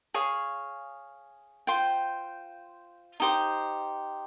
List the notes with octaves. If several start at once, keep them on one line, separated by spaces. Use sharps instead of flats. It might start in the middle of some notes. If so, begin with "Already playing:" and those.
G#4 C#5 F5
F4 C5 G5
D#4 G4 C5